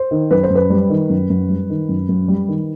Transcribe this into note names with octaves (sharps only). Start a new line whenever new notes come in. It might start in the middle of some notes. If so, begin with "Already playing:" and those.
Already playing: C5
D#3
F#2 B4
C5
F#2
B4
G3
D#3
F#2
F#2
G3
D#3
F#2
F#2
G3
D#3